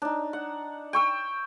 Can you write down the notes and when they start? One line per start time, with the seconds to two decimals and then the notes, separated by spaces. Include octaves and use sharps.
0.02 D4 D#4
0.33 F#5
0.93 G5 C#6 E6